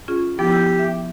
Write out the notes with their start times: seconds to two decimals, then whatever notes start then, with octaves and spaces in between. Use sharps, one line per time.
0.08 C#4 F4 G#4
0.39 F3 B3 E4 G4
0.52 E6 G6
0.79 E5